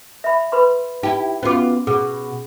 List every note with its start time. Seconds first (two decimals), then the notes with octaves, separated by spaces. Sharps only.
0.24 E5 B5
0.52 B4 B5 C6
1.03 D#4 E4 G4
1.43 B3 C#4 F4 F#4 D6
1.87 B2 G#4